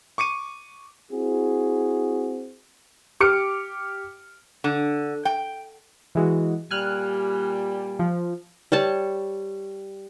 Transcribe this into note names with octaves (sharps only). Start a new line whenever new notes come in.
C#6 D6 C#7 D#7
C4 E4 F#4 G#4
G4 D6 F6 C#7 D7
D3
G5
E3 G#3 F#4
A#2 G3 G#5 F6 F#6
F3
G3 C#5 A5